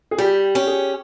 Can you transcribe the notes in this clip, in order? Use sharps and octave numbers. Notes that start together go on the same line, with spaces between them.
G#4
G3 G4
C#4 G4
G#4